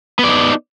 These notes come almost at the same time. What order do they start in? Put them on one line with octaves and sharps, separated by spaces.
B3 D5 D#4